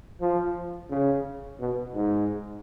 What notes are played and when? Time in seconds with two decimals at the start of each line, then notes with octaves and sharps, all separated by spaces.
0.21 F3
0.90 C#3
1.60 B2
1.94 G#2